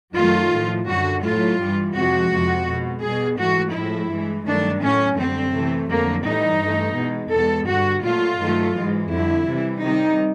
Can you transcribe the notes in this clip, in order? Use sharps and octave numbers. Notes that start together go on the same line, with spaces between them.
F#2 D#3 F#3 A3 F4
A2 F3 A3
F#2 D3 G3 F#4
A2 F#3 A3 F4
G2 E3 G3
F2 C3 F3 G#3 F#4
F2 C3 F3
B2 G#3
B2 G3 G#4
G#2 E3 A3 F#4
A2 F3 G#3 E4
G2 E3 G#3
G2 D#3 F#3 A3 D4
A2 F#3 A3 C#4
F#2 D3 G3 C4
C3 E3 A3
F2 D3 F#3 A3 A#3
A2 E3 G3 D#4
G2 E3 A3
B2 G#3
E2 B2 G#3 A4
G2 D3 G3 F#4
A#2 F#3 A3 F4
G2 D#3 F#3 A3
G#2 E3 G#3
F2 D3 G3 E4
C3 E3 G3
C3 D#3 G3 D#4